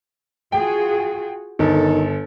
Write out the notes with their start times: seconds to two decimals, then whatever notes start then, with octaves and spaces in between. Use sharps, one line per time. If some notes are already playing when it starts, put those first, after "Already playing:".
0.52 F4 F#4 G#4 G5
1.59 G1 D#3 A4